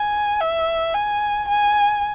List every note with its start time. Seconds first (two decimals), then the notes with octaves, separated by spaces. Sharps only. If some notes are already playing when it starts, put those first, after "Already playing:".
Already playing: G#5
0.40 E5
0.94 G#5
1.48 G#5